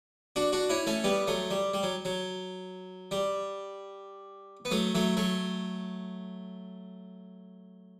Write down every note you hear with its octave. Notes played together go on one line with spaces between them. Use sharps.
D4 F#4
D4 F#4
C#4 E4
A3 C#4
G3 B3
F#3 A3
G3
G3
F#3
F#3
G3
B3
F#3 A3
F#3 A3
F#3 A3